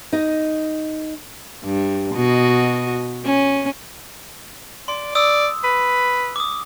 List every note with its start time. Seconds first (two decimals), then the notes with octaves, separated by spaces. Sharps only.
0.13 D#4 D#5
1.64 G2
2.15 B2 F#4 D#5
3.25 C#4
4.88 D5 C6
5.15 D5 D#6 E6
5.64 B4
6.36 D6 D#6